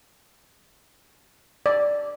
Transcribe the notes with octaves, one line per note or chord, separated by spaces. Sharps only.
D5